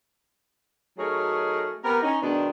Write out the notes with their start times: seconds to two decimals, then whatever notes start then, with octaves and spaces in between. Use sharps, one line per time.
0.98 F#3 A3 D#4 G#4 A#4 C#5
1.84 B3 C4 G4 A#4
2.03 C#4 D#4
2.22 B2 D#3 G#3 B3 D4